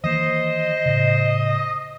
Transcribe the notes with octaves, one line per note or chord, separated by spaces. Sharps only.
D#3 E3 A#3 C5 D#5
A2 C#3